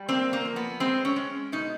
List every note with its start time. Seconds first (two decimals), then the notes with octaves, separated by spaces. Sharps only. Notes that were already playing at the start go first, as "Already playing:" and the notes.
Already playing: G3
0.09 A#3 C4
0.33 A#3
0.45 F3
0.56 B3
0.80 G#3 C4
1.05 C#4
1.16 G#3
1.52 B2 D#4